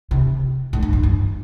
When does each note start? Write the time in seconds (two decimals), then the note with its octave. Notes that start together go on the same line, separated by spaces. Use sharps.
0.11 C3
0.73 A2
0.83 G#2
0.93 G2
1.03 G2